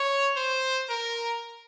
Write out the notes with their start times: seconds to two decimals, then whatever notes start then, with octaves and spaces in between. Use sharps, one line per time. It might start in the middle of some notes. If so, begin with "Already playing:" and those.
Already playing: C#5
0.36 C5
0.89 A#4